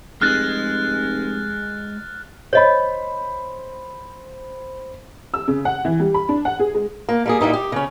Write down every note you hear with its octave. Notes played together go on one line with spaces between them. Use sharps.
F1 G#3 F6 F#6 A6
C5 C#5 D#5 B5
E6
C#3
F#5
E3
G3
B5
D4
F#5
G#4
G#3
A#3
G3 A#3 G#4
A#2 G3 D#4 E4
G4
C#3 C#4